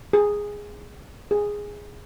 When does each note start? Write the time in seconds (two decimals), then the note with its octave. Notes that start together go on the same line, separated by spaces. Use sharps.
0.13 G#4
1.31 G#4